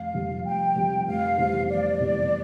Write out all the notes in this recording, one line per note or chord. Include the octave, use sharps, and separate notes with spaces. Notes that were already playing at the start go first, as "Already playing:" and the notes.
Already playing: F1 F5
F2 C3 G3
F1 G5
F2 C3 G3
F1 F5
E2 C3 G3 C4
F1 D5
E2 C3 G3 C4